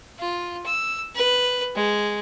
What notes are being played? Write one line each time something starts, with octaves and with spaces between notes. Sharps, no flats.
F4
E6
B4
G#3